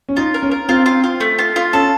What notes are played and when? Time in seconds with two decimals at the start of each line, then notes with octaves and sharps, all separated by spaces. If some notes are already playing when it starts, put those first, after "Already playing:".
0.09 C#4
0.17 D#4 F4
0.34 A#4
0.43 C#4
0.51 A#4
0.69 C4 F4
0.86 F4
1.04 F4
1.20 A3
1.39 F4
1.56 F4
1.73 C#4 A4